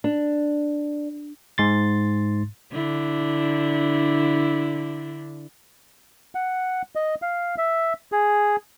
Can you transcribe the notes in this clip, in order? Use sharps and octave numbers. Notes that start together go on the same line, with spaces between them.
D4
G#2 C6 A6
D3 D4 E4
F#5
D#5
F5
E5
G#4